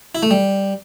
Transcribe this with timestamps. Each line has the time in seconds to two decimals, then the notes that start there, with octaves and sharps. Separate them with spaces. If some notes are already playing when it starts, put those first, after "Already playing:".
0.15 E4
0.23 A3
0.31 G3